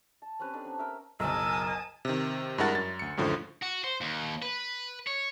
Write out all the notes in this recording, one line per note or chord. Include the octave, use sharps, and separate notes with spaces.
A5
C4 C#4 G4 B4
D4 D#4 A4
B3 C#4
A#4 E5 G5
F#1 B1 A#4 D#5 G#5 A5 D#6 E6
C3 D#3
G2 G#3 E4 A#4 F#5 A6
F#2 A6
D2 C#7
C#2 F#2 A2 D3 F3
F#4
C5
D#2
B4
C#5